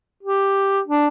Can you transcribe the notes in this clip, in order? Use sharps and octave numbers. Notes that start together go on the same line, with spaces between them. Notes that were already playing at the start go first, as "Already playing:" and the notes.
G4
D4